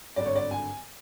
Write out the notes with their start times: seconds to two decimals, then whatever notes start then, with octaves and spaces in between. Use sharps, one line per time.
0.16 G#1 G2 D3 D5
0.26 C#5
0.35 D5
0.51 G#5